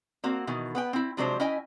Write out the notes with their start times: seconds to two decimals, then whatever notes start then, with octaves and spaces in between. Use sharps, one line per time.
0.24 A#3 C4 F#4
0.47 B2 D#3 E3
0.75 B3 B4 G5
0.93 C4 E4
1.17 C3 F3 F#3 G#3 D4 C5
1.40 C#4 E4 D#5 G5 G#5